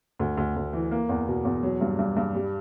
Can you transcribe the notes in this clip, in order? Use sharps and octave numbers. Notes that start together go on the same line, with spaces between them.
D2
D2
D2
E3
A#3
E2
B2
E2
F#3
G2
G2
G2
G3